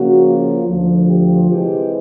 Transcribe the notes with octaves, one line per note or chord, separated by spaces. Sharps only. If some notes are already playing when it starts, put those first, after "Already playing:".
Already playing: C#3 F3 A#3 F#4
F4
D2 D3 F3
G4
C3 E3 G#3 C4 G4